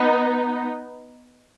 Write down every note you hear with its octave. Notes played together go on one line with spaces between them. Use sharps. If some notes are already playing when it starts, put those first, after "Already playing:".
Already playing: B3 D#4